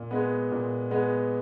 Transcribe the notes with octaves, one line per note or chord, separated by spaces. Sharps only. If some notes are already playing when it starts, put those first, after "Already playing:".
Already playing: A#2
G#3 B3
A#2
G#3 B3